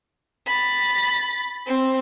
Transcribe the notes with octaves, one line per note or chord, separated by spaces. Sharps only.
B5 A6
C4